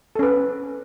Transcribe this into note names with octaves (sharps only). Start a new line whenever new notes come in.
C#4 A4 B4